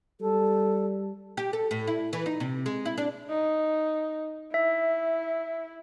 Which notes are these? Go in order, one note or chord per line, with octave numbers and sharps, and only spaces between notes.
G3 A4
G4
A4
A2
E4
E3
D#4
C3
G#3
E4
D4
D#4
E4 E5